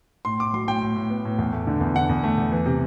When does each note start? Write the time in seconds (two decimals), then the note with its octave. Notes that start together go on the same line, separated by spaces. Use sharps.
0.25 A2 C6
0.39 A2 D6
0.53 F#3 C6
0.68 A2 G5
0.82 A2
0.96 A2
1.10 B3
1.25 A2
1.38 E2
1.52 A3
1.67 D3
1.81 E2
1.95 D3 F#5
2.09 E2
2.24 A3
2.37 E2
2.52 E3
2.66 C3